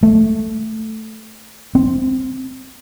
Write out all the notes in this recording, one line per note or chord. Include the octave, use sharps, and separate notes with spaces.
A3
C4